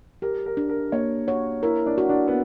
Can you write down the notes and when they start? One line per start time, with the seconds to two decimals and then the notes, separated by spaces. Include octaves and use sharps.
0.22 G4 A#4
0.46 A#4
0.57 D4
0.69 A#4
0.92 A#3 C#5
1.27 F#4 C#5
1.63 E4 A#4
1.86 D4
1.98 F#4
2.09 D4
2.28 B3